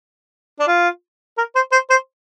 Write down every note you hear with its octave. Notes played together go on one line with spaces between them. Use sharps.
D4
F4
A#4
C5
C5
C5